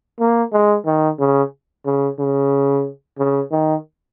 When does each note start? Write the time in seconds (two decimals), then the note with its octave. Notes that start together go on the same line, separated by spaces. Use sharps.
0.20 A#3
0.53 G#3
0.86 D#3
1.20 C#3
1.86 C#3
2.19 C#3
3.19 C#3
3.51 D#3